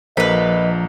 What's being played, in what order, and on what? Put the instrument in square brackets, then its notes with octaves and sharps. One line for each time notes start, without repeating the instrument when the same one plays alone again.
[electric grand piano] A#1 A#3 A4 [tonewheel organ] F3 [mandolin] B4 B5 [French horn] D#5